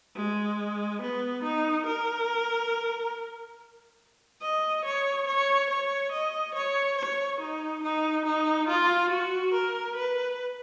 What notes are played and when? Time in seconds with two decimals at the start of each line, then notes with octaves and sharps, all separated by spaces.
0.16 G#3
1.02 B3
1.44 D#4
1.86 A#4
4.42 D#5
4.85 C#5
5.28 C#5
5.70 C#5
6.12 D#5
6.55 C#5
6.98 C#5
7.40 D#4
7.83 D#4
8.25 D#4
8.68 F4
9.11 F#4
9.54 A#4
9.96 B4